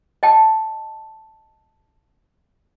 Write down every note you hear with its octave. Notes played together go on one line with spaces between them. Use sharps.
D#5 G5 A5